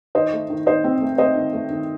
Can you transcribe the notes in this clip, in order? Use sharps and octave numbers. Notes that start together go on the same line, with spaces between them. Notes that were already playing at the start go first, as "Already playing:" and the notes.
D#3 C5 D#5
A3
D#3
D#3 C5 D#5
C4
A3
A3 C5 D#5
D#3
A3
D#3